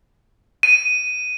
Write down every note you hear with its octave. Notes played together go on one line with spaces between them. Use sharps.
D#7